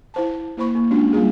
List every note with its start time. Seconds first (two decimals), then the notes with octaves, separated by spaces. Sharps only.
0.14 E4 C5 A5
0.57 A#3 E4 C5 B5 C#6
0.75 A#3
0.91 G#3 C#4 D4 F4 F#4
1.13 G3 A#3 F4 G#4